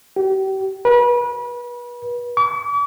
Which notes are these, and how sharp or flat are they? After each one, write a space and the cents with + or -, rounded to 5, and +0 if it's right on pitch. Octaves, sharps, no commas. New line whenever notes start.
G4 -35
B4 -35
D6 -45